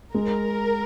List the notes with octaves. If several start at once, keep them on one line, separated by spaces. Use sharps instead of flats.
G#3 A#4